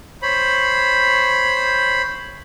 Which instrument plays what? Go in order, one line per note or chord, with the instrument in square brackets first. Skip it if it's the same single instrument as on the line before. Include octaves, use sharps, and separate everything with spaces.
[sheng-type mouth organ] C5 C#5 B5